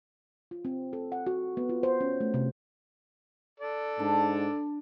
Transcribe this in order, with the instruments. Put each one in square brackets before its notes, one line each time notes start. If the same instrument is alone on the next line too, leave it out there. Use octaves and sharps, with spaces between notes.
[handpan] F4
C4
A4
F#5
F#4
B3
F4
C5
C#4
A3
C3
[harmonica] A4 D5
[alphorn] G#2 [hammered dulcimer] D4